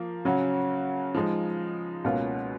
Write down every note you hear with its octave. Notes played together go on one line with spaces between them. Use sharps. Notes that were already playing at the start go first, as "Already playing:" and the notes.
Already playing: F3 A#3
C#3 F#3 C#4 F#4
F3 G#3 D#4
C#2 B2 A#3 C#4 F4